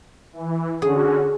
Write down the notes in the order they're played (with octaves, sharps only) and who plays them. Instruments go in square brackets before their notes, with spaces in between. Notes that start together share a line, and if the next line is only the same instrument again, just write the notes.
[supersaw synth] E3
[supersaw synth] D3 C#4 F#4 [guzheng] G#4